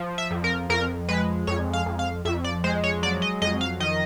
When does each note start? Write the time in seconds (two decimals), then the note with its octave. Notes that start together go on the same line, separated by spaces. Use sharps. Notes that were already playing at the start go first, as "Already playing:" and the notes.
Already playing: F3
0.18 E5
0.31 F2
0.44 A#4
0.70 F2 A#4
1.09 G#3 B4
1.47 F2 C#5
1.73 F5
1.86 F2
1.99 F5
2.25 F2 E5
2.44 D5
2.64 G#3 C5
2.84 C#5
3.03 F#3 D5
3.22 D#5
3.42 F2 D#5
3.61 F5
3.80 D#3 D#5